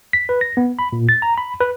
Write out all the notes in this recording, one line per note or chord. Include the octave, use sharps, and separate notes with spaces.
B6
B4
A#6
B3
B5
A#2
A6
A#5
B5
B4